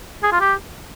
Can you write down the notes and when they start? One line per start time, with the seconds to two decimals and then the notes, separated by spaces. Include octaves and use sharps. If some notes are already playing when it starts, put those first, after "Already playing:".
0.23 G#4
0.32 F4
0.40 G4